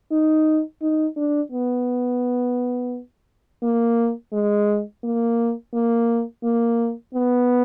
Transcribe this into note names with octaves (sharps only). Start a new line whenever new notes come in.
D#4
D#4
D4
B3
A#3
G#3
A#3
A#3
A#3
B3